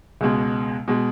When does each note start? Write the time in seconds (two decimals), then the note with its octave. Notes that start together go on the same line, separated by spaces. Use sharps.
0.21 C#2 B2 G#3
0.88 B2 G#3